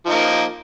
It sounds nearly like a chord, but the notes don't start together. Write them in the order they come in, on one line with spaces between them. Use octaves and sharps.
F3 D#4 A#3